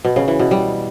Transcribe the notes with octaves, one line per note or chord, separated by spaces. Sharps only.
B2
C#3
E3
B2
G3